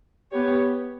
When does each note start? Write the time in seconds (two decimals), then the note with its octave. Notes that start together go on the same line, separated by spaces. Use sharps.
0.31 B3 G4 C#5